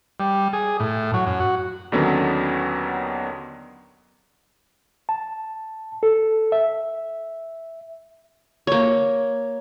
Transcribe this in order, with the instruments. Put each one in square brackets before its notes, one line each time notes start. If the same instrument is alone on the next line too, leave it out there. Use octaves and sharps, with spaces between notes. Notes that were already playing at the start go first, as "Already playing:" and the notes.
[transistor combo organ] G3
G#4
A2
F#3
F#2
F#4
[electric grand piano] D#2 D3 D#3 F#3 B3 C#4
[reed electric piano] A5
A4
E5
[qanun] A#3 C#5